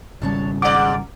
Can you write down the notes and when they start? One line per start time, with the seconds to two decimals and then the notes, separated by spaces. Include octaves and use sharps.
0.22 G#1 C#3 G3 D4 C#5 A5
0.62 G#2 D5 F#5 A#5 D6 F6